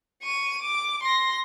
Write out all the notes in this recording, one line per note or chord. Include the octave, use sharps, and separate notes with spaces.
C#6 D#7
D6
C6 A#6